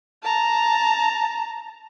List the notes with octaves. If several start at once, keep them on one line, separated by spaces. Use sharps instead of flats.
A5 A#5